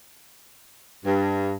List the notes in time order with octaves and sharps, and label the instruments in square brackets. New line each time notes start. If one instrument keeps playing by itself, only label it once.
[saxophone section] G2